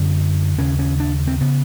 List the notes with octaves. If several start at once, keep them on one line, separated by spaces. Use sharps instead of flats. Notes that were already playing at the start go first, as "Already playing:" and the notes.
Already playing: F#2 D3 C#4
D#2 C#3 C#4
C#4
D4
C4
C#3 B3